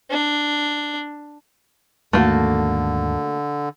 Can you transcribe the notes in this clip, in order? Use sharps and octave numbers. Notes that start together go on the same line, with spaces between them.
D4
D#2 G#2 D3 A3 A#3 F#4